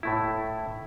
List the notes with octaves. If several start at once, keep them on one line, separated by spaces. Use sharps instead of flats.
A2 A3 E4